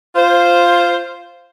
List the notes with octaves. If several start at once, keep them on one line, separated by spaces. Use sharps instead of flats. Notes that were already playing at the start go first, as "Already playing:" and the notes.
F4 C5